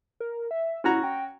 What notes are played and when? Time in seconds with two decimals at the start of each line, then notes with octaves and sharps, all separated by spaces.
0.20 A#4
0.51 E5
0.84 C#4 E4 F#4 A#5
1.04 G5